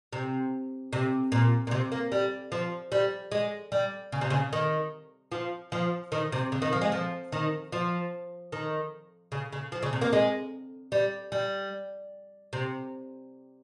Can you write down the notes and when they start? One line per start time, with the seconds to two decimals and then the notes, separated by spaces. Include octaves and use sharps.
0.13 C3
0.93 C3
1.32 A#2
1.67 A#2
1.71 C3
1.92 A#3
2.12 G3
2.52 F3
2.92 G3
3.32 G#3
3.72 G3
4.12 C#3
4.21 C3
4.30 C#3
4.53 D#3
5.32 F3
5.72 F3
6.12 D#3
6.32 C3
6.52 C#3
6.62 D#3
6.73 F3
6.81 G#3
6.92 F3
7.32 D#3
7.72 F3
8.52 D#3
9.32 C#3
9.52 C#3
9.72 F3
9.83 C#3
9.93 C3
10.01 A#3
10.13 G#3
10.92 G3
11.32 G3
12.53 C3